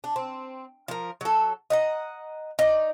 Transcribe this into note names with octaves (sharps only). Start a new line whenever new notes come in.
D4
C4
F3 A#4
F#3 A4
D#5 F#5 A#5
D#4 D5